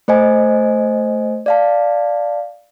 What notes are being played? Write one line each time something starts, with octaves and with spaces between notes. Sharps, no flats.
A3 C5 D#5 G#5
D5 F5 A5